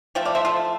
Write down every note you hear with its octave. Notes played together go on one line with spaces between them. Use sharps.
F3 A3 G5
D5 F5
C5 E5
F4 A4